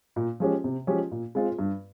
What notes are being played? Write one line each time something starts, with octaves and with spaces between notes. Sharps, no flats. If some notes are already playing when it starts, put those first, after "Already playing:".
A#2
F3 G#3 C#4 G4
C3
F3 G#3 C#4 G4
A#2
G#3 C4 F4 G#4
G2